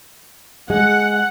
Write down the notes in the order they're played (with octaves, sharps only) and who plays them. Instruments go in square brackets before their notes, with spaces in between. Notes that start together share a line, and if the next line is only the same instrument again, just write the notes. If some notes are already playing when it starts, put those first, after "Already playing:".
[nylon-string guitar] G#3 [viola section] F#5